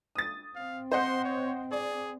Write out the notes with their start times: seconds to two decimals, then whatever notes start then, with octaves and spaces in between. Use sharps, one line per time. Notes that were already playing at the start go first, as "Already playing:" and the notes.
0.15 D#6 A6
0.56 C4 F5
0.92 C5 D#5 F#5 C6
1.25 C#5
1.72 G#4 D5